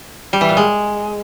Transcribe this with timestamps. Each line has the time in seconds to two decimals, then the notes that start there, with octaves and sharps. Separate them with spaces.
0.33 G3
0.41 E3
0.49 A#2
0.57 G#3